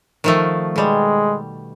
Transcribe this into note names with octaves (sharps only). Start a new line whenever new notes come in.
D#3 F3 A3
B2 G3 G#3